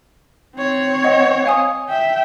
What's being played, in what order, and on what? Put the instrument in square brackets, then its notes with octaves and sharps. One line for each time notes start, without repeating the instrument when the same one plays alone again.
[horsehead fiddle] C4 C#5
[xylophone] D#5 F#5
F5 G#5 D#6
[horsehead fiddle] E5 G5